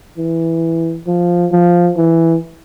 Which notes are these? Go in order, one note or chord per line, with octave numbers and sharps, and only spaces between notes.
E3
F3
F3
E3